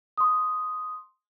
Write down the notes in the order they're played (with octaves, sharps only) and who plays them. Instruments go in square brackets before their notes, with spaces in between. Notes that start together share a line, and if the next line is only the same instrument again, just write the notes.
[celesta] C6 D#6